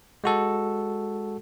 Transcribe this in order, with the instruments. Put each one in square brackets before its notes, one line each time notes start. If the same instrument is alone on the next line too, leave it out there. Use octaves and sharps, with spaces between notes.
[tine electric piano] G#3 F#4 A4